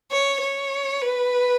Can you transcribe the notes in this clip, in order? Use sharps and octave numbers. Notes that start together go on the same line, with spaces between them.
C#5
C#5
B4